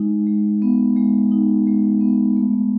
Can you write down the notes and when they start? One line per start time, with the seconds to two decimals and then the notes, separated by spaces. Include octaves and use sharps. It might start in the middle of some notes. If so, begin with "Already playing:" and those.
Already playing: G#3 D#4
0.27 G#3
0.62 B3
0.96 G#3
1.31 D#4
1.67 G#3
2.01 B3
2.36 A3